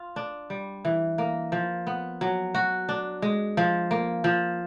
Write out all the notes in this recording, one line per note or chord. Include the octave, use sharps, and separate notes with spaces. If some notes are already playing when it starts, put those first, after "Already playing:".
Already playing: F4
D4
G3
E3
A#3
F3
B3
F#3
F#4
D4
G#3
F3
A#3
F3